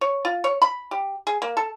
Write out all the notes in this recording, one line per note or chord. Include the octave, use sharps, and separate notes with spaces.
C#5
F4
C#5
B5
G4
G#4
A#3
A4